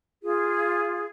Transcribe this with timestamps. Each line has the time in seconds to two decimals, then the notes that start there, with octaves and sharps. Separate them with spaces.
0.22 F4 G#4